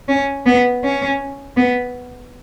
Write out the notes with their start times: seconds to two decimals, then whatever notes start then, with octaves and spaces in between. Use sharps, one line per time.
0.08 C#4
0.46 B3
0.84 C#4
1.57 B3